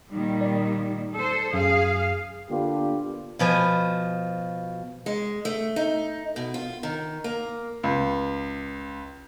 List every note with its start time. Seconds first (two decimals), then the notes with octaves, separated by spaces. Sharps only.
0.12 A#2 D#3 G3
0.41 D5
1.16 A4 C5
1.53 F#2 G#4 F5
2.50 D3 A#3 B3 D4 F4 G4
3.39 B2 F3 G#5
5.06 G#3
5.45 A3
5.76 D#4
6.36 B2
6.54 F4
6.83 D#3
7.24 A#3
7.83 C#2